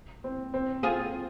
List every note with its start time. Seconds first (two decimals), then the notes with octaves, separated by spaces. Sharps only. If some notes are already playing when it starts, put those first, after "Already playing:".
0.24 C4
0.54 C4
0.83 C4 F4 G#4